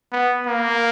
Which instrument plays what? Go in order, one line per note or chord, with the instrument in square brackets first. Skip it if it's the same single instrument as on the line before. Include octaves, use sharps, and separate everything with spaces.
[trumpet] B3
A#3